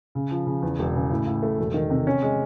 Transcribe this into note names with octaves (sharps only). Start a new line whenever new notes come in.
C#3
F3
C#3
E2
E1
C#3
A2
A2
A3
E1
D#3
C3
C#4
G#3